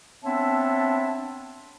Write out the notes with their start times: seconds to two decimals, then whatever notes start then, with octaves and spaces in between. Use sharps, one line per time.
0.23 B3 C4 D4 C#5 E5 A5